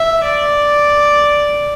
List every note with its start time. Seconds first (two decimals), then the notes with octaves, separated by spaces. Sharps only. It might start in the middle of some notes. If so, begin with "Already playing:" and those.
Already playing: E5
0.25 D5